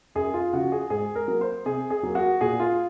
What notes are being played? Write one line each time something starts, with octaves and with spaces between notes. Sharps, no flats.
F#2 G#4
F4
C#3 F3 F#4
G#4
G#2 G#4
A#4
F#3 A#3
C5
C3 G#4
G#4
F#3 A#3
F#4
A#2 G#4
F4